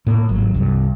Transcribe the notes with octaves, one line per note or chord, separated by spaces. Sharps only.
A2 A#3
G#1 F#3
C2 G2